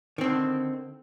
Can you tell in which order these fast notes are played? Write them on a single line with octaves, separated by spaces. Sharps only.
D#3 C4 D3